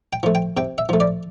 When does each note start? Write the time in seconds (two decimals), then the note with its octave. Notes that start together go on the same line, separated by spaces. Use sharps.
0.13 G5
0.23 F3 A3
0.35 G5
0.57 C3 G5
0.78 E5
0.89 F3 A3
1.00 D5